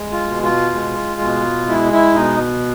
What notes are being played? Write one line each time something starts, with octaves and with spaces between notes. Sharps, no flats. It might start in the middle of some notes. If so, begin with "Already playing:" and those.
Already playing: G#3
F4
B2
F4
G#3
B2
G#3 E4
E4
B2 D#4